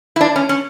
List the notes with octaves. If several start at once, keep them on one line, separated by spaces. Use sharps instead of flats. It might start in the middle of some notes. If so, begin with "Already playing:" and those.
E4
D4
C#4
C#4